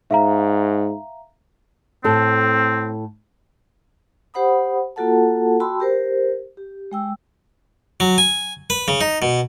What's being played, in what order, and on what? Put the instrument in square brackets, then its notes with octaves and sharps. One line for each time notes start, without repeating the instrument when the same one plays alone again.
[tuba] G#2 [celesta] E5 F5 A#5
[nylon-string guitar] A2 A4 [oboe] C4
[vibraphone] G4 C5 F#5 B5 D#6
A#3 F4 F#4 A4 F#5 A5
F#4 G5 A5 B5 C6 E6
G4 A#4 C5
G4
G#3 G5 E6
[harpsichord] F#3
G#5
B4
C#3
D#4
B2